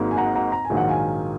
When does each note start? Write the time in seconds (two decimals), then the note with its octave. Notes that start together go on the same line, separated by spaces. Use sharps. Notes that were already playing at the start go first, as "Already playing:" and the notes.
Already playing: G#1 G#2 F#3 A#3 D#4
0.11 G#5
0.17 F#5 A#5
0.35 F#5 A#5
0.52 A#5
0.65 G#5
0.70 A#1 G#2 D#3 F#3
0.77 F#5
0.88 F5 G#5